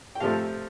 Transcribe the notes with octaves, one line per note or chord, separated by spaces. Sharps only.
G5
C3 F3 A3 F5 A5